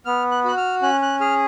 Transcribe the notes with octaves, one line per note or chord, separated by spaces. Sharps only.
B3 F6
F#6
F#4 F#6
F6
C#4 F#6
F#6
G#4 F6